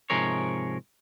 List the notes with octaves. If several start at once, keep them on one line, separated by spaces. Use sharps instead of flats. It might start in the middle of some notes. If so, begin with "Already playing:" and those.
G#2 C3 F3 G#4 A#4 C#5